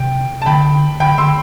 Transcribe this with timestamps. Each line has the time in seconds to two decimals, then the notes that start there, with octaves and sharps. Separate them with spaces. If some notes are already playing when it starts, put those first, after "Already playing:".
Already playing: C3 G5
0.42 A5
0.46 D3 G5 B5
1.00 D3 G5 B5
1.18 D3 C6 E6